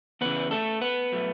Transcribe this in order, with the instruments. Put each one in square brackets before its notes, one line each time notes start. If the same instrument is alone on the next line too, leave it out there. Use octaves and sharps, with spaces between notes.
[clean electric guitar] E2 C#3 E3 B3 B4
A3 A4
B3 B4
A2 F#3 A3